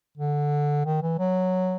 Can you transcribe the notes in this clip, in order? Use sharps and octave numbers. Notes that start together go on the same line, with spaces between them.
D3
D#3
E3
F#3